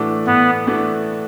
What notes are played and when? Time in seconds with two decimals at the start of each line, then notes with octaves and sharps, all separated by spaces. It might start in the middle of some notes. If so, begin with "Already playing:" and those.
Already playing: A2 E3 A3 D4 F#4
0.27 A2 B3
0.67 E3 A3 D4 F#4